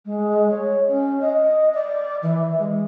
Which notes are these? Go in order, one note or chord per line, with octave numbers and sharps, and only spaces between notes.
G#3
C#5
C#4
D#5
D5
E3
G#3